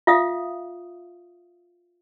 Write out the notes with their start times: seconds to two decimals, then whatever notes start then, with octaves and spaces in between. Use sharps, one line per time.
0.07 F4 E5 F5 D#6